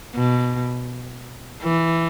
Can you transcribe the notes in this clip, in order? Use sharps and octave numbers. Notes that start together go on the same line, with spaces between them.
B2
E3